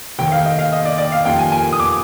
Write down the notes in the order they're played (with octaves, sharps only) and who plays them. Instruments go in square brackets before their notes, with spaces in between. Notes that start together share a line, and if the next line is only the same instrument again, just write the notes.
[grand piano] F1 D#2 D#3 [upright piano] G5
[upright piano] F5
D#5
F5
D#5
D5
D5
F5
[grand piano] F2 D#3 G3 A#3 F4 [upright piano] G5
[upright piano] G#5
G#5
D#6
D6